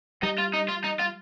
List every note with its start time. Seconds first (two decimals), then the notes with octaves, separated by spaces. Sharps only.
0.23 G3 D#4
0.38 F4
0.53 D#4
0.68 F4
0.84 D#4
0.99 F4